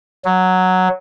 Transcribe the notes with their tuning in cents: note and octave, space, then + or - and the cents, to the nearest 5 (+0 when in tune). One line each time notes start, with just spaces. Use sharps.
F#3 +0